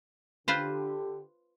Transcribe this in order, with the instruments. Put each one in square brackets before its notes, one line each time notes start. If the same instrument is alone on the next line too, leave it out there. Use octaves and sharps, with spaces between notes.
[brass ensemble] D3 G4 [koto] F4 B4 C5